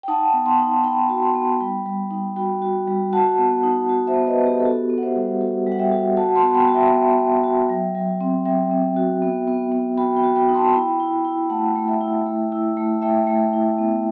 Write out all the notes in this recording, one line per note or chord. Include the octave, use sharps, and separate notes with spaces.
G5
D#4 F#5 A5
B3
A5 C6
D#4
D#4 G5 B5
F#4
A5 C6
B3
G3 G5 B5
G3
D#4
F#4 G5 B5
F#4
G3
F#4 F#5 A5
B3
D#4
F#4
C5 E5
B3
B4 D#5
B3
G4
A4
F#4 G4
B3
F#5
C5 E5
G3
F#4
G3
F#5
E5 G5
F#4
F#4 F#5 A5
A5 C6
B3
G5 B5
F#4
E5 G5
B3
B3
F#4
F#3
F#3
C4
F#3 E5 G5
C4
F#4
B3
B3
B3
F#4 G5 B5
G5 B5
F#4
G5 B5
D#4
A5 C6
E4 G5 B5
E4
E4
A3 F#5 A5
A3
E5 G5
E4
A3
E4
A3
A3 E5 G5
A3
E4
B3